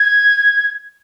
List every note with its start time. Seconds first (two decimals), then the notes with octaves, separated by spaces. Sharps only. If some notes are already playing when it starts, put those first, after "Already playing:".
Already playing: G#6